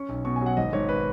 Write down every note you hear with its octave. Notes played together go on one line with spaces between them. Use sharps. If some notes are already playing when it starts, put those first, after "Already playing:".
Already playing: C#4 C#6
B1
B2 C#6
G#5
F#3
F#5
G#1 D#5
G#1 C#5
B4